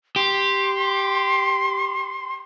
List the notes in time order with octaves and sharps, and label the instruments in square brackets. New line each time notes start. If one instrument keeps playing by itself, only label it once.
[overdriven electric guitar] G4 [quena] C6